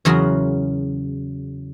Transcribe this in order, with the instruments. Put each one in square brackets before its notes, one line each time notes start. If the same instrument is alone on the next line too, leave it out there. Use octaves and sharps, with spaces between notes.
[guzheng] E2 C#3 F#3 F#4 A#4 C6